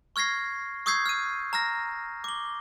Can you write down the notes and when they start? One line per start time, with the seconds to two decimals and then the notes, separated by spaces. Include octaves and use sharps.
0.16 C#6 F6 G#6 A#6 C7
0.86 C#6 D#6 E6 G6 G#6 C7
1.06 F6 D#7
1.53 A#5 F6 A#6
2.24 D6 G7